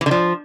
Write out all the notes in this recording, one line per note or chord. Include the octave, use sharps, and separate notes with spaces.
E3
D3
F3